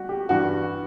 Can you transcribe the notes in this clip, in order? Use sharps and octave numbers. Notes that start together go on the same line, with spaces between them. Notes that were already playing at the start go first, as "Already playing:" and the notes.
Already playing: G3 F#4
G4
G2 E3 G3 F#4